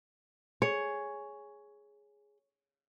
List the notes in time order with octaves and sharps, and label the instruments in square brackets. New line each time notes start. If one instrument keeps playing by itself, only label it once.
[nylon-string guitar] G#4 [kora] C#5